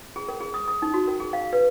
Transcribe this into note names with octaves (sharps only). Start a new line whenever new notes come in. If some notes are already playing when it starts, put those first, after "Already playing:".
G#4
A#4
G#4
D#6
D#6
D#4
F#4
A#4
G#4
F5
B4